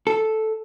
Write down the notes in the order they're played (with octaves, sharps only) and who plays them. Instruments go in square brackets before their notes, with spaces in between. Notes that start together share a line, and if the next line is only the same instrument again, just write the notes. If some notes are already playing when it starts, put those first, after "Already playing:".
[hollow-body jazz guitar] A4